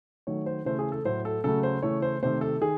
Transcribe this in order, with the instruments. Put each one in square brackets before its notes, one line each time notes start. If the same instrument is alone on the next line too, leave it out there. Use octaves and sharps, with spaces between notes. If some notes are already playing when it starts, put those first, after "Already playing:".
[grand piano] D#3 F#3 A3 C#5
C5
C#3 E3 A3 C5
G#4
A4
A2 F#3 A3 C5
A4
C#3 F#3 A3 A4
C5
C#3 E3 A3 C#5
C5
C3 D#3 A3 C5
A4
D#3 G#4